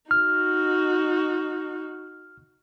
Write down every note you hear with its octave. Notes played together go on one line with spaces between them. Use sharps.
D#4 F#4 F6